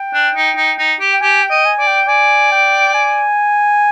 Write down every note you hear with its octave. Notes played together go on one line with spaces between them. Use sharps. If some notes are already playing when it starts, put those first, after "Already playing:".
Already playing: G5
D4
D#4
D#4
D#4
G4
G5
G4 G#5
G5
D#5
G#5
D5
G5
D5 G#5
G5
G#5